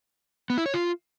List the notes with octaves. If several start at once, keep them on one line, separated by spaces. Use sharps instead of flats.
B3
E4
C#5
F4